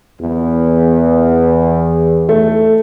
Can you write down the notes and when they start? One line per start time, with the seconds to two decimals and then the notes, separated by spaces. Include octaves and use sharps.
0.21 E2
2.29 A3